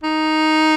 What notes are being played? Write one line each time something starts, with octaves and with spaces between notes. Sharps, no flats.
D#4